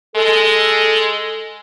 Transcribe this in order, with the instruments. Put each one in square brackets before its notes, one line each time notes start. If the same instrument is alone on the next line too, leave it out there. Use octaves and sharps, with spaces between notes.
[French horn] G#3 [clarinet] A4